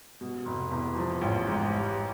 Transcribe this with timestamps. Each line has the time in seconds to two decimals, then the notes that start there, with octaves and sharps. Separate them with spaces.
0.21 B2
0.46 F1
0.71 E2
0.96 F3
1.21 A1
1.47 G#2
1.72 G3